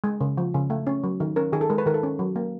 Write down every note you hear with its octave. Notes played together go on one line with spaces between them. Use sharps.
G#3
C#3
F3
C#3
A3
C#4
F#3
D#3
C#4 A#4
D#3 G#4
A4
G#3 A#4
B4
D#3 A#4
A4
C#4
F#3
A#3